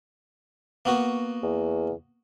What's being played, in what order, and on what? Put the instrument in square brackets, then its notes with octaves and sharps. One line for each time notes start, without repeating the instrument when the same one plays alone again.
[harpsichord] A#3 B3 F#4
[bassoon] E2